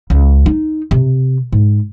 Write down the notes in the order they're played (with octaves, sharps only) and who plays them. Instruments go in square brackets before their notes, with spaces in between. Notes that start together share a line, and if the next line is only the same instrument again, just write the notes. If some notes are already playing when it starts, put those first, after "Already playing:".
[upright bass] C#2
D#4
C3
G#2